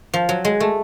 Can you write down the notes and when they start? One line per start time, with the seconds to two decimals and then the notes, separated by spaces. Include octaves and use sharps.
0.14 F3
0.29 F#3
0.45 G#3
0.60 A3